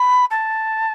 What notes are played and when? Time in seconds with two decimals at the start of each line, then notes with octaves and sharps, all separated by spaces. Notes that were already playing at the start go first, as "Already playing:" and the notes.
Already playing: B5
0.31 A5